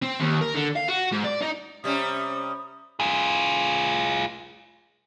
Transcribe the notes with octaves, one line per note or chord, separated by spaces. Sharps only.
C4
D#2
A#4
D3
F5
F#4
G#2
D5
D#4
C3 G3 C#4 D#6
F4 G#4